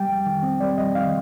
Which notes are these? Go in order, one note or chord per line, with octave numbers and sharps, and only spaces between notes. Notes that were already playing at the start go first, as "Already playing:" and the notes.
Already playing: G3 G5
F2
D#3
C4
G3 D5
F2 D#5
D#3 F5